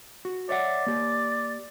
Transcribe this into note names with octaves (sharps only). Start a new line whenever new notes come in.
F#4
C#5 D5 E5 F#5
A#3 G4